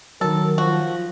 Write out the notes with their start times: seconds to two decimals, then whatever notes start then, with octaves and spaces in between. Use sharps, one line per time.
0.21 D#3 F#3 A4 A#4
0.58 F3 F#4